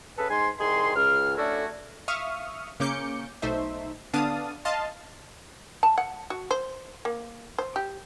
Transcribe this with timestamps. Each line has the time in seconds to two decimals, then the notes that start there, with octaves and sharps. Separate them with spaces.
0.19 C#3 G#4 A4 B4
0.30 G#2 G#5 C6
0.60 C2 D#3 G#4 C6
0.96 C#2 F6
1.37 A3 C#4 D4 E4 F#4 A4
2.08 E5 F5 C#6 D#6 F6
2.80 C#3 A#3 C#4 D6 G6 C#7
3.42 B1 A3 D#4 C5 E5
4.13 D3 B3 D4 F5 A5 D#6
4.65 D#5 F5 A5 C6
5.83 A5
5.98 F#5
6.30 F#4
6.51 C5
7.05 A#3
7.58 C5
7.76 G4